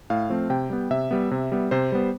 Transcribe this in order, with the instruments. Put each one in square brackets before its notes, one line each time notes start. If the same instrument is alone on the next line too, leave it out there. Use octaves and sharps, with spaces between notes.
[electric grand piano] A2 F5
F3 A3 C4
C3 G5
G3 B3
C3 E5
G3 B3
C3
G3 B3
C3 C5
G3 B3